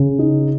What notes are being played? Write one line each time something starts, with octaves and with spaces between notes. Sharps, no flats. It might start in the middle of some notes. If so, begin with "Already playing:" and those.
Already playing: C#3
D#4